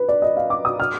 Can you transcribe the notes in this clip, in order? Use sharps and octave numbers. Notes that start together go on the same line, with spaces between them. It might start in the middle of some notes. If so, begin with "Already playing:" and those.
Already playing: B4
D5
D#5
F5
D6
D#6
F6